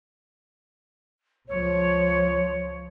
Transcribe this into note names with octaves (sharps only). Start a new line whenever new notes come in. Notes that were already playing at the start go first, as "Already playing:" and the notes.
C#2 F3 C#5